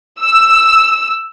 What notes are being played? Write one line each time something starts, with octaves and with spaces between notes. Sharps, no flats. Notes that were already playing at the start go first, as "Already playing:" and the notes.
E6